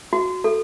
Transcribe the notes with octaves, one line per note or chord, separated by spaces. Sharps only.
F#4
A4